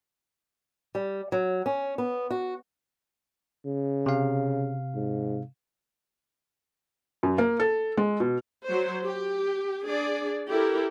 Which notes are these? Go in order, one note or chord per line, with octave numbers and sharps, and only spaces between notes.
G3
F#3
C#4
B3
F#4
C#3
C3 F5
G#2
F#2
A#3
A4
G#3
B2
F#3 C5
G4
D4 G#4 D5
E4 G4 A4 A#4